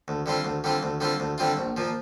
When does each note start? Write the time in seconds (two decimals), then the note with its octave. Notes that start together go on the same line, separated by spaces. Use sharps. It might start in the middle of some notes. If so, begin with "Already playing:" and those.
0.08 D2
0.26 D3 G3 C4 F4
0.45 D2
0.64 D3 G3 C4 F4
0.83 D2
1.00 D3 G3 C4 F4
1.20 D2
1.38 D3 G3 C4 F4
1.57 A#1
1.77 A#2 F3